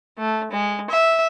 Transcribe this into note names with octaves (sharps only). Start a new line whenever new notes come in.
A3
G#3
E5